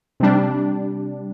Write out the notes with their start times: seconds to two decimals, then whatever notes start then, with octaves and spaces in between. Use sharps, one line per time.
0.20 C3 G3 D4